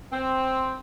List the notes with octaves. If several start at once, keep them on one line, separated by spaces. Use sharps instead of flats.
C4